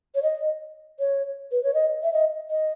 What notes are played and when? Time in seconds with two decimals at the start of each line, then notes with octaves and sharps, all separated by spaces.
0.15 C#5
0.23 D#5
0.99 C#5
1.52 B4
1.63 C#5
1.74 D#5
2.03 E5
2.13 D#5
2.50 D#5